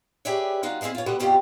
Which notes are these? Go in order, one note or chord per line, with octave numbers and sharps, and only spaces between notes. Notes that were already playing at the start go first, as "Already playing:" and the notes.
G4 G#4 B4 C#5 D5 E5
G3 D#4 F4 F#4
C4 E4 G#4 D#5 F5
F4 C#5
B2 D3 G3 A3 B3
G2 B2 G3 C4 F4 G4